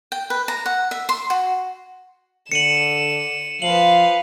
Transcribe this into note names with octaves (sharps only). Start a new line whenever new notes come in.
G5
B4
A#5
F#5
E5
C6
F#4
D3 C#7 D#7 E7 F#7
F3 B4 F5 F#7